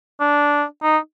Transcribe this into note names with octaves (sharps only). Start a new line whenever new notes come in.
D4
D#4